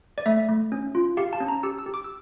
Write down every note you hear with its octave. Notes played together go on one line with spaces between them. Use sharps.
D5
A3 E5
A3
C#4
F4
G4 F5
A5
C#4
A#5
G4 E6
E6
G4
D6
E6